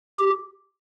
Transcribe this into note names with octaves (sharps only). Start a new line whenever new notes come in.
G4